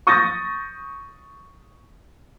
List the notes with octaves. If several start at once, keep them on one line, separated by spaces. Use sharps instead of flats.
C#6 D#6 G6 A6 A#6